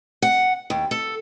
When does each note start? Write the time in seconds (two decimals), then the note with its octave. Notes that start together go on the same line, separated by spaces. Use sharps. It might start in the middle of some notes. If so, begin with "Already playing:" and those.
0.22 F#5
0.70 D#2
0.91 A4